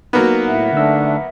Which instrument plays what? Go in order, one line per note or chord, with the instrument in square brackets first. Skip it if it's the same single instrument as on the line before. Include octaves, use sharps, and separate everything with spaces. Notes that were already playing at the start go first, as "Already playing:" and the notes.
[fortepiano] F#3 A#3 B3 [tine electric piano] D#4
[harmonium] A2 [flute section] E5 F#5
[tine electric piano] D3 D#4 E6 [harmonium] A3 D4